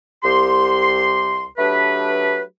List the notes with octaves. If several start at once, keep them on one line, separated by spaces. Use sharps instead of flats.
C2 G4 C6
F#3 A3 D4 G4 B4